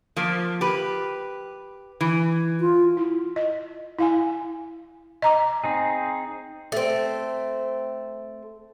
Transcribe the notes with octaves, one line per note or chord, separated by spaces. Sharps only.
F3 A#3
G4 B4
E3
F4
E4
D#5
E4 F5 G#5
D#5 A#5 D6
C4 D#4 G#4
A3 C4